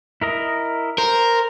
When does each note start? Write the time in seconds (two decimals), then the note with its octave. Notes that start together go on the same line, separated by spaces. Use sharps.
0.21 E4 A#4 D#5
0.98 A#4 C5